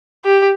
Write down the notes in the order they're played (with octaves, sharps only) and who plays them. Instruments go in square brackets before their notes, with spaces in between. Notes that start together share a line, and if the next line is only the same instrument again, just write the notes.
[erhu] G4